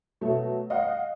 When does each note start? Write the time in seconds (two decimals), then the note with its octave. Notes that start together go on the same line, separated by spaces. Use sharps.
0.21 B2 F#3 A3
0.70 D#5 F5 F#5